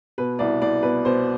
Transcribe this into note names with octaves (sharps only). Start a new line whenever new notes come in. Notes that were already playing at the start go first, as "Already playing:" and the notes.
B2 B4
C2 D5
C2 D5
B2 B4
B2 C5